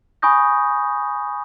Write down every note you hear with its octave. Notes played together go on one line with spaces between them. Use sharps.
G#5 B5 C#6 D#6 G6 A#6